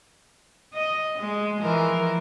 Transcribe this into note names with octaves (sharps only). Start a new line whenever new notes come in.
D#5
G#3
E3 F3 A#4